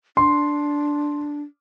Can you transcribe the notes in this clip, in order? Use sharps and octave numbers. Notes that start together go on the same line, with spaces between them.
D4 C6